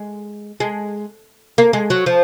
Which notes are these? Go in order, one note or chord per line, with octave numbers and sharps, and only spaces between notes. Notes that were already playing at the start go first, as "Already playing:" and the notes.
Already playing: G#3
G#3
A#3
G#3
F#3
F3